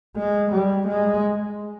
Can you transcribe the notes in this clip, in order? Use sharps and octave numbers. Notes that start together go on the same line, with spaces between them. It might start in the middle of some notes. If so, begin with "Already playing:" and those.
G#3
G3
G#3